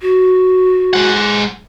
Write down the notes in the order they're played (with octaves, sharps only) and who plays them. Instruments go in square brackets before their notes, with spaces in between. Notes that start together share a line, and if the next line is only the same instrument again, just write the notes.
[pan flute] F#4
[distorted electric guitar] G#3 F#5